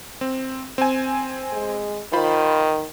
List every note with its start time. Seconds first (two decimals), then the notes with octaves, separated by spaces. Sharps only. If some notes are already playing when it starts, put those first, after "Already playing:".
0.21 C4
0.78 C4 G#5
1.53 G#3
2.13 D#3 F4 C5 B5